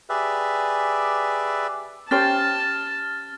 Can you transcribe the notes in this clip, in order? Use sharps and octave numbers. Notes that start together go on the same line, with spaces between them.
G4 G#4 B4 D5 E5
C#4 G4 C5 A5 F6 A6